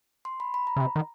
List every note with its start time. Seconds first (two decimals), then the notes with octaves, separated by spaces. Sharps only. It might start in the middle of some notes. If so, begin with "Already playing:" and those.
0.25 C6
0.40 B5
0.54 B5
0.67 A#5
0.76 C#3
0.81 C3
0.96 D#3